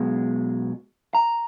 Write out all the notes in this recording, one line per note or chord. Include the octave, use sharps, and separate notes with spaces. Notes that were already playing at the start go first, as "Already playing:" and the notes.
Already playing: B1 B2 G#3
A#5